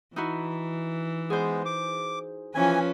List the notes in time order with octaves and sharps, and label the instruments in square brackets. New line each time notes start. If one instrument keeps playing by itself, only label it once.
[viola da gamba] E3 [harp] D#4 E4 F#4
[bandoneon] G#3 B3 [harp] G#4 C5
[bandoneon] D6
[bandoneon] E3 G#5 [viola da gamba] F3 C#4 B4